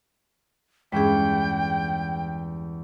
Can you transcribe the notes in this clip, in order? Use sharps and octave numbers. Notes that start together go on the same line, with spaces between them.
E2 G2 G#3 C#4 G#4 G5